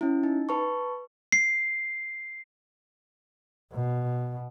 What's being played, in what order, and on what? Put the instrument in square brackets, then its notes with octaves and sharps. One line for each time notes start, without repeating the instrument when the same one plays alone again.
[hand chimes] C#4 E4
D#4
B4 A5 C#6
[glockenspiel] C7
[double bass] B2